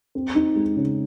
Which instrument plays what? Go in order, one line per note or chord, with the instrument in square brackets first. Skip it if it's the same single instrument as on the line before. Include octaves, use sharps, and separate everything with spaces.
[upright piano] C4
D#4
G#3
C#3